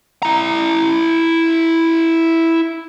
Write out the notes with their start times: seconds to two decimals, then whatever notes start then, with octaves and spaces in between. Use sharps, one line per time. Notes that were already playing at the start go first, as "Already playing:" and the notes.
0.23 E4 A#5